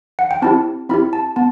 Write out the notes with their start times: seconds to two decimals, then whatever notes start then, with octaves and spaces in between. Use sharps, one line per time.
0.19 F#5
0.31 G5
0.42 C4 E4 G4 A5
0.89 C4 E4 G4 B5
1.13 A5
1.36 B3 A5